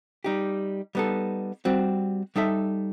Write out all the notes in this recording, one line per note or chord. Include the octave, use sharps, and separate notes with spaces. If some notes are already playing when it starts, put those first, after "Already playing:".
G3 D#4 G4
G3 B3 D#4 A4
G3 C4 F#4
G3 D#4 A4 E5